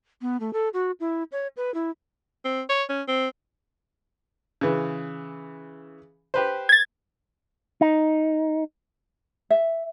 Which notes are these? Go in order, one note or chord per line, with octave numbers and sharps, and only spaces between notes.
B3
A3
A4
F#4
E4
C#5
B4
E4
C4
C#5
C#4
C4
C#3 E3
G4 B4 C5
G#6 A6
D#4
E5